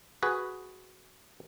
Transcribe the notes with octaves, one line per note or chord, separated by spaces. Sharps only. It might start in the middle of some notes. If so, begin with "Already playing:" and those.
F#4 G#4 B4